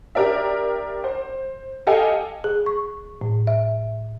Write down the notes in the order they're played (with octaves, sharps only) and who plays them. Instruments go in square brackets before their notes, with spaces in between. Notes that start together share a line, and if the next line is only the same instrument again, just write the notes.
[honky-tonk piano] D4 G4 A#4 D5 E5
C5
G4 A4 D#5 F5 G5 G#5
[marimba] G#4
C#6
A2
E5